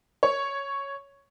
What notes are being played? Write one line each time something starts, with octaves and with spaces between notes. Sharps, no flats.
C#5